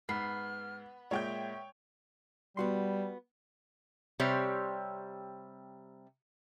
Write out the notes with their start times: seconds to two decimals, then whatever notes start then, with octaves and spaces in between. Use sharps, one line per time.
0.09 G#2 B3 F6 C7
1.11 A#2 G#3 C#5 E5 G5 G6
2.57 G3 B3 F#4 C6
4.20 C3 G3 C4 C#5